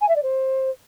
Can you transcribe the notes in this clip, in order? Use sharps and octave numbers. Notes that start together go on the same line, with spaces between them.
G#5
E5
D5
C5